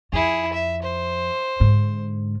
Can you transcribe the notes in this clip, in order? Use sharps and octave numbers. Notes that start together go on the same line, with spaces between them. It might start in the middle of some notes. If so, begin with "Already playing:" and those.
F2 E4 G#4
E5
C5
G#2 D3